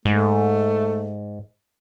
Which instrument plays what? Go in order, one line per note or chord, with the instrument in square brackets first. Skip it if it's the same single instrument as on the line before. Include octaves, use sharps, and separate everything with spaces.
[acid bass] G#2 [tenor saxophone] A3